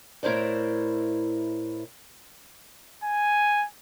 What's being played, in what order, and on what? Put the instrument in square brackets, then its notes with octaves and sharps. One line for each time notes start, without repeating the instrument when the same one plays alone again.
[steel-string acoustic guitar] A2 E4 A#4 C5 D5
[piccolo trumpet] G#5